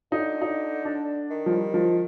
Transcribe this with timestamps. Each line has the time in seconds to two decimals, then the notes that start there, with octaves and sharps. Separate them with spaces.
0.12 D3 D#4
0.42 D#4
0.85 D4
1.30 D#3
1.46 F3
1.51 G3
1.74 F3